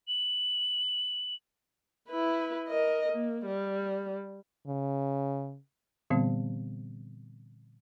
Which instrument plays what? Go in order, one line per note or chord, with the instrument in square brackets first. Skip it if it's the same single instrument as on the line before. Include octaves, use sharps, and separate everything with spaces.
[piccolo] F#7
[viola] E4 B4
A#4 D#5
A#3
G3
[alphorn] C#3
[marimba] A#2 D3 E3 G3 B3 C4